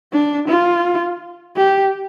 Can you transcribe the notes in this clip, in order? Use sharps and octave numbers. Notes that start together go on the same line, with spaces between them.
D4
F4
G4